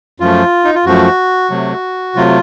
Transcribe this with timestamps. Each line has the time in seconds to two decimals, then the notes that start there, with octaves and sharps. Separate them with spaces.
0.20 F#2 F3 A3 F4
0.64 D#4
0.74 F4
0.85 F#2 F3 A3 F#4
1.50 C3 F#3 A3
2.15 C3 F#3 A3 F4